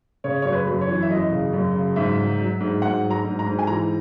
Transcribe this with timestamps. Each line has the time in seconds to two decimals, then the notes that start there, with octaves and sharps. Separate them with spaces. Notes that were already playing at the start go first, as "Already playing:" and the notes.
0.24 C#3 C#5
0.42 F#2 C#5
0.52 B4
0.67 F#2
0.81 C#5
0.88 E3
1.02 E5
1.10 F#2 D#5
1.31 C#3
1.53 F#2
1.74 C#3
1.96 G#2 E5
2.18 F#3
2.38 F#3
2.60 G#2
2.82 G#2 F#5
3.03 F#3
3.11 A#5
3.24 G#2
3.39 A#5
3.46 G#2
3.59 G#5
3.67 E3 A#5